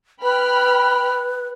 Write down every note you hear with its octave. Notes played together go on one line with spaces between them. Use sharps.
B4 G5 B5 F6